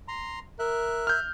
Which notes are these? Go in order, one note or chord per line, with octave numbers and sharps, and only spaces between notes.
A#5 C6
A#4 E5 F#6
F6 G6